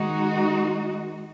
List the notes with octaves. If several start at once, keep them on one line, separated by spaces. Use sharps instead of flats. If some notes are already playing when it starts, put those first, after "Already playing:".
Already playing: D#3 G#3 D#4 F#4